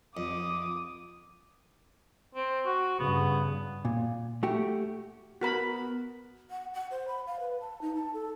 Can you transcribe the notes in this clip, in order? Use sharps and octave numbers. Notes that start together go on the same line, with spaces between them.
F2 D6 D#6
C4
F#4
G2 C#3 B3
A#2
A3 F#4 G4
B3 F#4 A#4 B5
F#5
F#5
C5
B5
F5
B4
A5
D#4
A5
A4